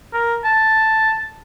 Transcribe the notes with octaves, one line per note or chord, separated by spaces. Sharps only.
A#4
A5